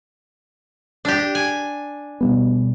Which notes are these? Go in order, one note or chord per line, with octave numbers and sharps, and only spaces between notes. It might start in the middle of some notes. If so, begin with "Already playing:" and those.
D4 G4
G#5
B2 G3 B3